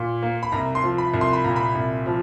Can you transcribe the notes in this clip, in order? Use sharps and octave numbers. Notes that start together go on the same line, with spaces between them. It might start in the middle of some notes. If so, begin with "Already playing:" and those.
Already playing: A#2
A#3
B5
C2 A#5
C6
F3
B5
C2
C6
B5
A#2 A#5
B5
C2
F3